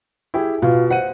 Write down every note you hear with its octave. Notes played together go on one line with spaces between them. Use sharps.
E4 G4 G#4
B2 F4
C5 F#5 D#7